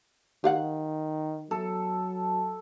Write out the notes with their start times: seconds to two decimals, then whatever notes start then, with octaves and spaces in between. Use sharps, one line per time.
0.44 D#3 G4 F5 F#5
1.51 F#3 A4